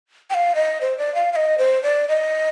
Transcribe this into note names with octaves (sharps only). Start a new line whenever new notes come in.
G5
F5
D#5
C5
D5
F5
F5
D#5
C5
D5
D#5